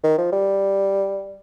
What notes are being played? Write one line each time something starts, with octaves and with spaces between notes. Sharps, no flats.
D#3
F3
G3